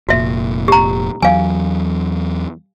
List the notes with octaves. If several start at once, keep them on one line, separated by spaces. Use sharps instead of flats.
F1 A#2 F#4 E5
G4 A#5
E2 F#3 F5 G#5